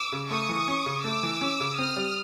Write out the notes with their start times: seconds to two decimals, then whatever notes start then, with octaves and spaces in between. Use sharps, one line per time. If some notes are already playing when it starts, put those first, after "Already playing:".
Already playing: D6 E6
0.12 C#3
0.31 A3 C#6 D#6
0.49 E3
0.68 C#4
0.86 C#3
1.04 A3 D6 E6
1.23 E3
1.41 C#4
1.60 C#3
1.78 C4 D#6 F6
1.97 G3